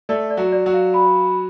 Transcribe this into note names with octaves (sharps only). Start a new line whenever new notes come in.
A3 A4 D5
D5
F#3 F#4
D5
F#3 F#4
F5
B5